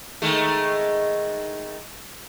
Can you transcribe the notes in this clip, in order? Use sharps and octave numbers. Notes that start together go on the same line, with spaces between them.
D#3 G#3 A3